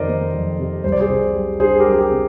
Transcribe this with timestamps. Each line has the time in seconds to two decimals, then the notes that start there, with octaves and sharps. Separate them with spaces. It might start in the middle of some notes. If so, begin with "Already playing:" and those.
Already playing: F2 C3 D#3 A#4 C5 D5 D#5
0.08 A#3
0.34 F2
0.59 C3
0.84 C2 C5
0.92 D5
1.00 G#4 C5
1.10 C3
1.34 G3
1.60 D4 G#4 C5
1.79 G4 A#4
1.85 C2
1.93 G#4
1.98 G4
2.11 C3